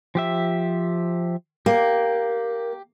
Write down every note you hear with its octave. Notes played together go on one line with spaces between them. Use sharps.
F3 G4 E5
A#3 G4